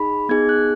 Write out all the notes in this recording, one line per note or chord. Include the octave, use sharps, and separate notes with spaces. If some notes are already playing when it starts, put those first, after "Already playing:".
Already playing: D#4 G#4 B5
B3 D#4 G#4 G#6
F#6